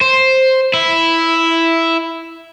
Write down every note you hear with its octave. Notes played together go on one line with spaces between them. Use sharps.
C5
E4